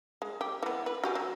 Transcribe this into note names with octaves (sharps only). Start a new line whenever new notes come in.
G#3
G4
E3 B3
B4
F#4 G4 G#5
F#3